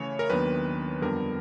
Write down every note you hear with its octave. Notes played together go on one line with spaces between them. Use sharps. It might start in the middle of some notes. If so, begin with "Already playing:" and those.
Already playing: C#3 E3 A3 C#5
A#4
D#2 D#3 F#3 B3 D4 B4
F2 D3 G3 B3 A#4